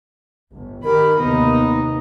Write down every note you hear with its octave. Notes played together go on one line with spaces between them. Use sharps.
G1
D#3 G4 A#4 B5
D#2 C3 B3 D#4